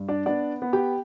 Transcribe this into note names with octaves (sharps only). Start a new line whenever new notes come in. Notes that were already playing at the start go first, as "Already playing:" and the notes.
Already playing: G2
D4 D5
B3 D4 D5
B3
G4 G5